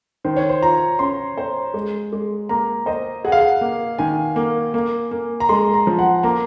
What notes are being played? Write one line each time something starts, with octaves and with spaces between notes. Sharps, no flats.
D#3 C5
C#5
C5
F4 A#5
C#4 C6
C5
G#3
G#3
A#3 A#5
C5 D#5
G#4 F#5
F5
F#5
A#3
D#3 G#5
A#3
A#3
A#3
A#5
G#3 C6
A#5
F3
F#5
A#3 A#5